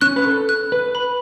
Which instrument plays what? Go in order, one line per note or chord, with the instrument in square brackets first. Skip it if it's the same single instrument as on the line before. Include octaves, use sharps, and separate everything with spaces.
[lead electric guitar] C#4 [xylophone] F#6
[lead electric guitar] B4
A4
[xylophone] F#6
[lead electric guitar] B4
[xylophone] B5